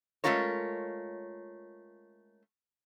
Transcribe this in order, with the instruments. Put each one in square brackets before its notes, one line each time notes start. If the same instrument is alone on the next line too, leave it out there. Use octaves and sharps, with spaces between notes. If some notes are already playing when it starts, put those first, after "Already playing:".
[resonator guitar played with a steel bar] G#3 A3 C#4 F4 A#4 C#5